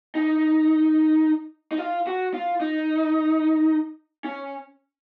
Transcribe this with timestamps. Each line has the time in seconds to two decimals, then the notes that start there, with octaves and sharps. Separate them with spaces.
0.15 D#4
1.71 D#4
1.78 F4
2.07 F#4
2.34 F4
2.61 D#4
4.25 C#4